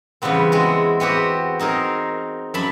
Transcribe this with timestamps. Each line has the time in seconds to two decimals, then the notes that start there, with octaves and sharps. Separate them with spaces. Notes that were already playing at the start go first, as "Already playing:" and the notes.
0.22 E2 C#3 G3 B3 C4
0.52 G#3 C4 E4 F#4
1.00 B3 C4 F#4 G4
1.59 C4 D#4 G#4 A#4
2.54 F#2 E5 A5 B5